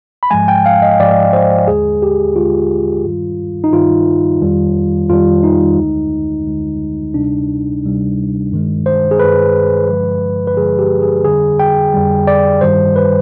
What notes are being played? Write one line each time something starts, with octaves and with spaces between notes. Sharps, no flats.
B5
G#2 F3 G#3 G#5
G5
F5
D#5
G#2 F3 G#3 D5
C5
D#2 D3 G#3 G#4
G4
D#2 D3 G#3 F4
G2 D#3 G3
D#4
G2 D#3 G3 F4
F2 D#3 G3
F2 D#3 G3 F4
D#4
D2 D3 G#3
D2 D3 G#3
D2 C3 G3 D4
D2 C3 G3
G2 D#3 G#3
C5
G#4
G2 D#3 G#3 B4
G2 D3 F3 G#3
B4
G2 D3 F3 G#3 G#4
G4
G#4
F2 D3 G3 G#4
G5
F2 D3 G3
D5
G2 D#3 G3 C5
B4